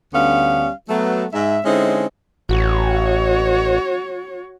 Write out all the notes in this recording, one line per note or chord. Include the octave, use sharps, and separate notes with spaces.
D2 D3 G3 B3 C#4 F5
F#3 A3 B3
G#2 G#3 E5
D3 G#3 C4 C#4 D#4 E4
A1 F#4 C#5